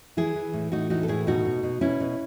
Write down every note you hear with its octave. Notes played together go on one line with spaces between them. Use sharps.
E3 E4 G#4
E3
A2
A2 D#4 F#4
E3 D#4 F#4
A4
A2 E4 G#4
B2 D#4 F#4
B2
B2
B2 C#4 E4
B2